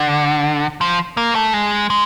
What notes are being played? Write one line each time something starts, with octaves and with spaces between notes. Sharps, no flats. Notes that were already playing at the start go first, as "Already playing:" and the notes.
Already playing: D3
F3
A#3
A3
G#3
G#3